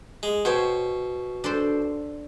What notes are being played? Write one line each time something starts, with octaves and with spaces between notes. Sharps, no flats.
G#3
B2 C5 C#5 G5
D4 A4 C5